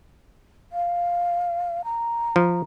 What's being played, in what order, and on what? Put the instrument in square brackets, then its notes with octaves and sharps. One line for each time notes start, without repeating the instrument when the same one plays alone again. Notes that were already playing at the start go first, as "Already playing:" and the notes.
[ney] F5
A#5
[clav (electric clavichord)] F3